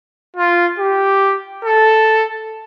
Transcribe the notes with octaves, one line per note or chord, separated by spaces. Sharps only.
F4
G4
A4